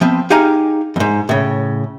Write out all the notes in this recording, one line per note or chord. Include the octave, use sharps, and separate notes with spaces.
F3 B3 C4
D#4 G4 G#4 F5 G#5 A#5
F2 G#2
A2 C#3